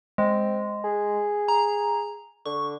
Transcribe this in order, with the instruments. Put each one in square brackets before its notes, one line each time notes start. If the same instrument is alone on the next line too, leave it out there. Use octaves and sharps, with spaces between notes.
[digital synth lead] G#3 [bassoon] C4
[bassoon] G#4
[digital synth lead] A#5
[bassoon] D3 [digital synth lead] C#6